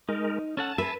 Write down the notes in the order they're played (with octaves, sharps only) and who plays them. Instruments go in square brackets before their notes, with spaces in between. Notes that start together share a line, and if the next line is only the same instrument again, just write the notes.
[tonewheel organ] G#3 A#4 [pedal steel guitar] D#4
[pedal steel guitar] C#4 A4 F#5 [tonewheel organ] A5
[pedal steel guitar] G#4 E5 [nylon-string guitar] B4